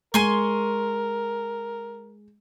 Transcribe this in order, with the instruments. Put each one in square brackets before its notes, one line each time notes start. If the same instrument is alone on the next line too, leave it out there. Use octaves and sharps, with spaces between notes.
[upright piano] G#3 [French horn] A#4 [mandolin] G#5 C6 C#6